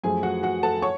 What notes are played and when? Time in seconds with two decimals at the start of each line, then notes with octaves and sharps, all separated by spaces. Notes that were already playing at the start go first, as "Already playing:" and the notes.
0.03 F#2 F3 A3 G#4 G#5
0.23 F#4 F#5
0.43 F#4 F#5
0.63 A4 A5
0.82 C#5 C#6